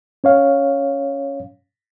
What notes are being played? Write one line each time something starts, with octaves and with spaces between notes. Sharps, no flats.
C#4 C#5 F5